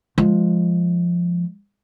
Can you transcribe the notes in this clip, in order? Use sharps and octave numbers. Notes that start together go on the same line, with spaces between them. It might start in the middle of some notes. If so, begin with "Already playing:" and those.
F3 G#3